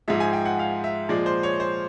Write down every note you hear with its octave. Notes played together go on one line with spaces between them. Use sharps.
G#2 F3 G#3 E5
G#5
G5
F#5
F5
E5
A#2 F3 G#3 D5
C5
C#5
C5